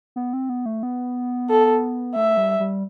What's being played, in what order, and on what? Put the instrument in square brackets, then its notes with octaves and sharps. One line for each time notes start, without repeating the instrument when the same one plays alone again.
[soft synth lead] B3
C4
B3
A3
B3
[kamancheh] A4
[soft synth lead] A3 [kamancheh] E5
[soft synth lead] G3
G3